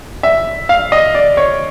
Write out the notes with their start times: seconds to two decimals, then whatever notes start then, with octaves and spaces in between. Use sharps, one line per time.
0.23 E5
0.69 F5
0.92 D#5
1.15 D5
1.37 C#5